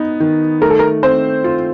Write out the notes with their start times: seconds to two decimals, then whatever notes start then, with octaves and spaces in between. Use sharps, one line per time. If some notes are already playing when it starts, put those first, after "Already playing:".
Already playing: B3 D#4
0.20 D#3
0.61 A3 A#4
0.70 A4
0.79 A#4
1.03 C4 C5
1.44 F4